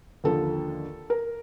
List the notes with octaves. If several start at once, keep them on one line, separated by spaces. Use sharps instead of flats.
D#2 D3 F3 A4
A#4